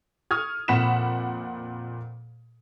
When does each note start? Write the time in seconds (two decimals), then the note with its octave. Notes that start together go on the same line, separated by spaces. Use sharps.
0.31 C#6 D#6 F6 G#6
0.68 F2 A#2 F#5 B5 B6 E7